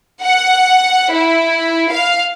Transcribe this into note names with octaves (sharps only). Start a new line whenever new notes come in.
F#5
E4
F5